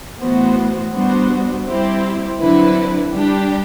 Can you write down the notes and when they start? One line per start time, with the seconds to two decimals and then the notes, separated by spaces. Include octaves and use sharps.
0.19 A2 E3 B3 F#4 C5
0.92 G3 B3 D4 F#4 C5
1.66 G3 C4 E4 G4 C5
2.40 D3 F#3 C4 E4 B4
3.13 G3 D4 G4